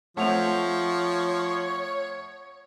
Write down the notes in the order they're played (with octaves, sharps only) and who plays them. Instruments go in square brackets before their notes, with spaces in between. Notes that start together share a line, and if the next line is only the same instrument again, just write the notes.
[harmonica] F3 [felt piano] A3 C4 [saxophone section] C#5 [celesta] F#5 F7